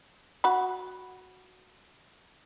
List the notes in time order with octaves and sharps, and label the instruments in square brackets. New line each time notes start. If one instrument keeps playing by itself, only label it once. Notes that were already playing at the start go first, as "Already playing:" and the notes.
[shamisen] F#4 B5